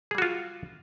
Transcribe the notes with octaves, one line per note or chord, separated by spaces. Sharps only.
G3 F4 F#4 G#4